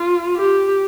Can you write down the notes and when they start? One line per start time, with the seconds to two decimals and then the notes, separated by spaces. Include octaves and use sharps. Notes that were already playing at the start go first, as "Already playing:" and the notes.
Already playing: F4
0.37 G4